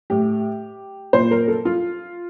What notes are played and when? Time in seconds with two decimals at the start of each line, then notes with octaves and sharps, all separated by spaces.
0.10 A2 G4
1.13 A#2 C5
1.31 A#4
1.48 A4
1.65 F4